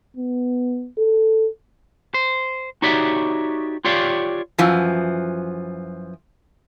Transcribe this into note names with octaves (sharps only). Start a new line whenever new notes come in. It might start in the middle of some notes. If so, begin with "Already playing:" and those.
B3
A4
C5
D#4 F#4 G4 C#5 D5 E5
F4 G4 C#5 D5 F5
F#2 E3 F3